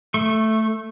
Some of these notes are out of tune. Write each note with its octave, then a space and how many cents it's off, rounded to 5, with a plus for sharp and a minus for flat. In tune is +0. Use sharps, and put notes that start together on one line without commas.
A3 +0 C#6 -25